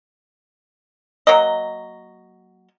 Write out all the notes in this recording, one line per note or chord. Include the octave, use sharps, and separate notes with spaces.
F#3 A#3 D#5